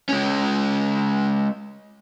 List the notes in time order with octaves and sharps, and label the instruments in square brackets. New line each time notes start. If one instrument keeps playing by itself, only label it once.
[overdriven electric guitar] G#3 C#4